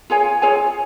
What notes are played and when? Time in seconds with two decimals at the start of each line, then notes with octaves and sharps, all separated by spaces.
0.10 F4 G#4 C#5 G#5
0.42 F4 G#4 C#5 G#5